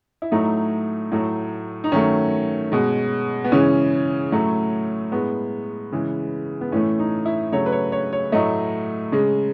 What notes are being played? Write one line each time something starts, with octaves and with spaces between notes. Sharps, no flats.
E4
A2 F#3 A3 D#4
A2 F#3 A3
D#4
D#3 F#3 A3 C#4
B2 G#3
B3
C#3 E3 G#3 C#4
A2 F#3 A3
A2 G#3 B3
C#3 E3 G#3
B3
A2 E3 A3 C#4
D#4
E4
C#3 F#3 A3 C#5
B4
C#5
C#5
C#5
A2 F#3 A3 D#5
C#3 G#3